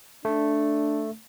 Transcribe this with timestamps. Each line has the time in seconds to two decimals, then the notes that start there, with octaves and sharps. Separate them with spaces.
0.25 A3 D4